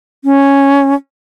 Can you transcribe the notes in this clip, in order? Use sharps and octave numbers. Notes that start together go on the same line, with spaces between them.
C#4